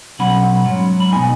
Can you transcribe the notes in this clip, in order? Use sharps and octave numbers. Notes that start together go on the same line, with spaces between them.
B2 F#3 C#4 F#5 B5
G#2 F#3 C#4
B5
B2 B3 D#4 D#5 G#5